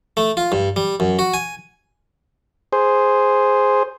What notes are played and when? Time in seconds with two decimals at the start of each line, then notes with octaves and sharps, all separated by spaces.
0.17 A3
0.37 F4
0.52 G2
0.76 G3
1.00 F#2
1.19 F#4
1.34 G#5
2.73 G#4 C5